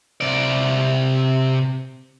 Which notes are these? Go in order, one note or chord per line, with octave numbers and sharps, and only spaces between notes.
C3 D5